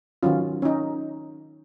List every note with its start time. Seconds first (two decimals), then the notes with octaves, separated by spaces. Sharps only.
0.23 D#3 F#3 C#4 F4
0.62 C#4
0.65 D#4